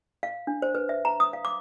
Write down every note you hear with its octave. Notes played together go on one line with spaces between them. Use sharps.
F5
D4
C5
B4
E5
A#5
D#6
F5
D6